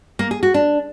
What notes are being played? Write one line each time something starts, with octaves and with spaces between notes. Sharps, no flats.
A#3
G#4
F#4
D4